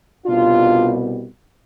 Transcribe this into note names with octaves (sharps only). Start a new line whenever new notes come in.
C2 B2 G3 D4 F4